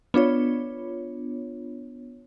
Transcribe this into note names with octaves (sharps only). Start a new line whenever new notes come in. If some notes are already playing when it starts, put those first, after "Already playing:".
B3 D4 F4 C#5